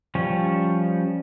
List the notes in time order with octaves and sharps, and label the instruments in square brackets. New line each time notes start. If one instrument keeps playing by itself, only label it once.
[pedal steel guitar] F3 G3 C#4